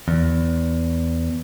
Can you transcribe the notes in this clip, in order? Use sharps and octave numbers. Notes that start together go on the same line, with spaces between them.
E2